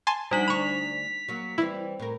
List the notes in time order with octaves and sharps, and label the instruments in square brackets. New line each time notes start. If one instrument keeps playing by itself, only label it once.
[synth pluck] G#5 A5 C6
[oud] F3 D4 F#4 [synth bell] G3 D#4 F#7 [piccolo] B6
[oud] D2 D4 [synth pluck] B5 C#6 [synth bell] F7
[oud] F#3 A#3
[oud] E3 G3 C4 [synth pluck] E4
[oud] A2 A#4